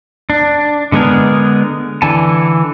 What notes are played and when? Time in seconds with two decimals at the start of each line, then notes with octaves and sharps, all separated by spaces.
0.30 D4
0.92 D3 G#3 B3 G#4 A#4
2.02 D3 E3 G#5 A5